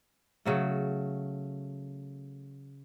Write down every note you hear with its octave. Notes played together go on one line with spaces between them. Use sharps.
C#3 F#3 A3